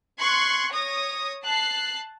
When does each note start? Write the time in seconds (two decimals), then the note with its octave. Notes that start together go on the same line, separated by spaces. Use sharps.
0.18 C6 C#6 F#6 G#6
0.72 C#5 D#6 A#6
1.43 A5 F#6 C7